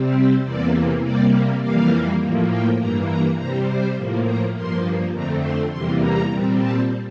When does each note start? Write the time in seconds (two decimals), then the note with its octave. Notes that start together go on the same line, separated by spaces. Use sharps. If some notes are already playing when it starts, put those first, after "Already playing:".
Already playing: C3 G3 C4
0.15 G4
0.44 E2 C3 E3 A#3 D5
1.03 C3 G3 A#3 D5
1.61 F2 E3 G3 A#3 F5
2.21 A2 F3 A#3
2.50 G5
2.79 G2 E3 A#3 A#5
3.09 A#5
3.38 C3 G3 C4 A#5
3.67 C5
3.96 A2 F3 A#3
4.26 A#5
4.55 G2 F3 A#3 C6
5.13 F2 D3 A3 C4 A#5
5.43 C6
5.72 E2 C3 E3 G3 A#3 C6
6.02 A#5
6.30 A#2 G3 C4
6.60 A5